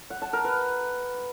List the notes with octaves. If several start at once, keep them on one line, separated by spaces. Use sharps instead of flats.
F#5
A5
A#4
B4